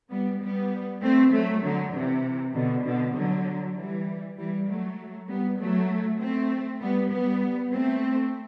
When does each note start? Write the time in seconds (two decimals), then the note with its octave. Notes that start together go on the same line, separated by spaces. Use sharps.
0.10 G3 B3
0.40 G3 B3
1.01 A3 C4
1.32 F#3 A3
1.62 D3 F#3
1.93 C3 E3
2.54 B2 D3
2.84 B2 D3
3.15 D3 F#3
3.76 E3 G3
4.37 E3 G3
4.68 F#3 A3
5.28 G3 B3
5.59 F#3 A3
6.20 A3 C4
6.81 G3 B3
7.11 G3 B3
7.72 A3 C4